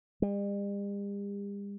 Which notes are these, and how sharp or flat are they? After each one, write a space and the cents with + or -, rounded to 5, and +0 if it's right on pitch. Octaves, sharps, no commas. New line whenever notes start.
G3 +45